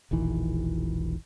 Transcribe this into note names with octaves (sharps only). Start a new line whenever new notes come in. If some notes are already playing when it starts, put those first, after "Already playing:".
E1 A#1 D#3 E3